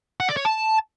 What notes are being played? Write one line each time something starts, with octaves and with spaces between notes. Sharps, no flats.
F#5
D5
C#5
A5